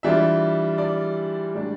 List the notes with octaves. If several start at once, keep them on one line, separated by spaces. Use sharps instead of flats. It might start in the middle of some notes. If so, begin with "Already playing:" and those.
E3 G3 D4 F4 E5
D5
A2 G3 D4